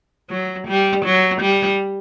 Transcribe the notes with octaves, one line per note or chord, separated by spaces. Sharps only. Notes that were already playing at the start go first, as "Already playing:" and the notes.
F#3
G3
F#3
G3